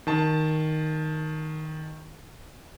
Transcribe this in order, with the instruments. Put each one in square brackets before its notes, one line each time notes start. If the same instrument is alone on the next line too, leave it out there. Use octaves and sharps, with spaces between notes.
[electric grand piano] D#3 A5